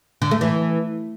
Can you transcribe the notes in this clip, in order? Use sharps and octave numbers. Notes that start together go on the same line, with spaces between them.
D3
A3
E3